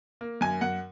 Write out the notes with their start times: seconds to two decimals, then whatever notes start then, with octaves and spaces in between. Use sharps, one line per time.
0.21 A#3
0.41 F#2 G#5
0.61 F#2 F#5